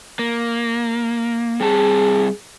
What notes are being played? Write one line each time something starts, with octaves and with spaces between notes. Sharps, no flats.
A#3
G3 C4 G#4 A5